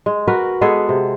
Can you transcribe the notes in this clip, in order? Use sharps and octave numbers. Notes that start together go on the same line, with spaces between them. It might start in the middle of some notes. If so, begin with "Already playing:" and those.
G#3
F#4 A#4 B4
G#3 B3 G#4 A4
C3